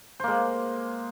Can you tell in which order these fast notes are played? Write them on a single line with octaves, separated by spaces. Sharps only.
C5 A#3 G#3